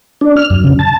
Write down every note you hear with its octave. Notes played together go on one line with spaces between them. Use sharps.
D4
F6
F#2
C#3
A5